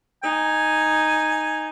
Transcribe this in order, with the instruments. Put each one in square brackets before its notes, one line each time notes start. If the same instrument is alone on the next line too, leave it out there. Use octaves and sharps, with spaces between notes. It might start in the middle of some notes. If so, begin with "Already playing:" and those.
[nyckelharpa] D#4 [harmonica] G#5